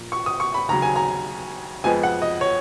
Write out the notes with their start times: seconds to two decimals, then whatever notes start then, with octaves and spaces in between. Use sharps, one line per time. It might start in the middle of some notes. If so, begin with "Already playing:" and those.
Already playing: A#2 F3 A#3
0.12 C#6
0.26 D#6
0.40 C#6
0.54 B5
0.69 D#2 C#3 F#3 A#5
0.82 G#5
0.96 A#5
1.84 F2 F3 G#3 B3 G#5
2.03 F#5
2.22 D#5
2.41 C#5